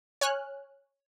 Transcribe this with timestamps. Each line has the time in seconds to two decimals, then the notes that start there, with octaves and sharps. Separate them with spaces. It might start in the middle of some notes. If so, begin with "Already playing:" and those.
0.21 C#5 G#5 F6 F#6